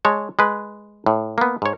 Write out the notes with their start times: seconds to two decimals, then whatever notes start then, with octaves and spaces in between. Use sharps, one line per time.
0.05 G#3 C#5 A5
0.39 G#3 B4
1.06 A2
1.38 A#3 B3
1.62 G#2 C#5